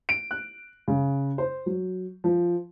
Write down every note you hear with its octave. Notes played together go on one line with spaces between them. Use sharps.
D7
F#6
C#3
C5
F#3
F3